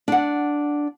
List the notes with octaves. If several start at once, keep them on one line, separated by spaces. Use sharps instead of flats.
D4 F#5